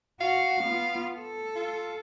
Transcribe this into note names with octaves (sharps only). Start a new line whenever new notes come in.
F#4 F5
B3 F4
A4
F4